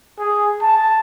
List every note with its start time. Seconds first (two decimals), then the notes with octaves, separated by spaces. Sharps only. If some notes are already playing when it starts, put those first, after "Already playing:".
0.19 G#4
0.62 A5